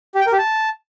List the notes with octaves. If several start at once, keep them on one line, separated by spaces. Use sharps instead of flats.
G4
G5
A#4
G4
A5